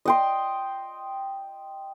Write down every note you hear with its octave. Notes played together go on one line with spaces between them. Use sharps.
D#5 G5 C6